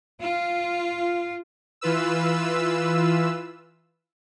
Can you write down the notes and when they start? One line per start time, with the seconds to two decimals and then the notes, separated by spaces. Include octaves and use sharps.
0.20 F4
1.81 E3 F4 B4 E6